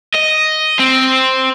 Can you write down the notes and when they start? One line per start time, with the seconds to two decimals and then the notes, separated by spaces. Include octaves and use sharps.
0.14 D#5
0.80 C4